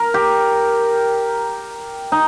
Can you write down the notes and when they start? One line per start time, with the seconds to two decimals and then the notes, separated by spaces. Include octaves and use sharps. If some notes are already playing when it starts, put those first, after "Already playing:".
Already playing: A#4
0.14 G4
2.12 D#4